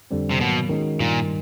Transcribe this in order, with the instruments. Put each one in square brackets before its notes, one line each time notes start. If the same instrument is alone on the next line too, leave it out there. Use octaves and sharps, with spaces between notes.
[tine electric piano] F2 D3 G3 C4
[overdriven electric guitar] C3
[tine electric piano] G#2 D#3 F#3 A#3 [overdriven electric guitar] B2
[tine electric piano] D#3 G#3 C#4 F#4
[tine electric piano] G2 D#3 G3 [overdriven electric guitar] A#2